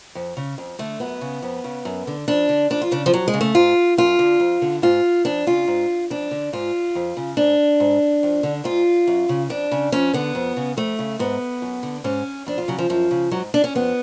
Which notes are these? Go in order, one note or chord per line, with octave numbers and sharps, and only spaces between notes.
F2
C#3
F2
D3 A3
F#2 B3
C#3
F2
C#3
F#2
D3
F2 D4
D3
F2 D4
F4
C#3 D4
F3
F2 F#3
G#3
C#3
A3
G#2 F4
F#2 F4
D3
F2
D3
G#2 F4
F2 D4
C#3 F4
G#2
F2 D4
D3
G#2 F4
F2
C#3
G#2 D4
G#2
F2
D3
G#2 F4
F#2
C#3
F2 D4
C#3
F2 C#4
D3 B3
F2
C#3
F2 A3
C#3
G#2 B3
F#2
D3
G#2 C#4
F2 D4
F4
C#3 F#3
F3
F#2 F3
C#3
G#2 F#3
D4
C#4
F2 B3